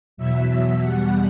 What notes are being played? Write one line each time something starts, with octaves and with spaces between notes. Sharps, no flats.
E2 B2 F#3 E5
E2 B2 G3 F#5